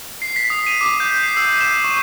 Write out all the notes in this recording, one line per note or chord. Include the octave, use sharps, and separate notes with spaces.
C7
B6
D#6
D#7
D6
G6
C7
E6
E7
C#6